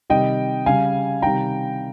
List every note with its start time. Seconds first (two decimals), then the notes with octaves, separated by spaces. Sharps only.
0.10 C3 D#3 G3 D#5 G5
0.66 C#3 G3 F5 G#5
1.22 C3 D#3 G3 G5 A#5